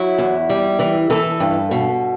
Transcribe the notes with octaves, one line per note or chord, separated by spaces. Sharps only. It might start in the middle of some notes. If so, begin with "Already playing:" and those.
Already playing: F#3 E4
E2
G3
E3
E3 A4
G2
B2